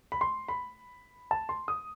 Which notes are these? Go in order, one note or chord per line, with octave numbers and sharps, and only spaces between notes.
B5
C6
B5
A5
C6
D#6